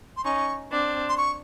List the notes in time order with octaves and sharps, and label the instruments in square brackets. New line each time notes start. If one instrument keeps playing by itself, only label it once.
[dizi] C6
[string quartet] C#4 D#4 [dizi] C#6
[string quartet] C4 D4
[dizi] C6
C#6